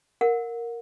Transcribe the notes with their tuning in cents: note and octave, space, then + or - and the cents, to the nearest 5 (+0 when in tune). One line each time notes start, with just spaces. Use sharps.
A#4 +0 F#5 -30